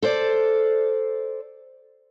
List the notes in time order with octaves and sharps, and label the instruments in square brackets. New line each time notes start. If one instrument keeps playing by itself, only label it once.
[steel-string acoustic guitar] A4 C5 D5